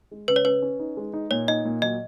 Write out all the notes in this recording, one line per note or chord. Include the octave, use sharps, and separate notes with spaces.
G#3
C#3 B4
C#5
C#4 B4
C#4
D#4
G#3
D#4
A#2 C#5
D#4 D#5
A#2
F#3 D#5